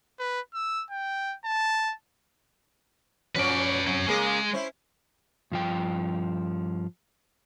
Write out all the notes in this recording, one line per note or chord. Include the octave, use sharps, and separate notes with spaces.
B4
E6
G5
A5
F3 F#3 C#4 B4 D5
C3 F#3 C#4
C#3 G#3 A#3 G#4
C#4 E4 C5
G2 F3 G5